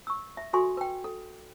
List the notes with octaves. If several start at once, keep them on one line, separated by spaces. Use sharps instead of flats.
C#6 E6
E5
F#4 A4 E5 G#5 C6 C#6
B4 G5
A4